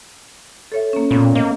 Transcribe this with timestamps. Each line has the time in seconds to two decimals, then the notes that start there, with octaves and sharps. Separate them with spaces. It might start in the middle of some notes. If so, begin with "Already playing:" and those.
0.72 A4 C#5 E5
0.93 A#3 C#4
1.11 A#2 B3 C#4 C#5
1.35 A#3 D#5